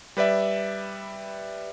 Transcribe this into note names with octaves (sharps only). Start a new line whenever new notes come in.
G3 B4 D5 E5